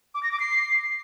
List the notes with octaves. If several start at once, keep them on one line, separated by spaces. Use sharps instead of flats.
D6
A#6
D6
C7